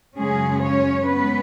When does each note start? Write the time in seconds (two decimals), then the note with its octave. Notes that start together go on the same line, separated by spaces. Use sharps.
0.18 F#2 C#3 F#3 G#3 C#4 G#4
0.63 C#4 C#5
1.08 G#3 B3 C#4 B4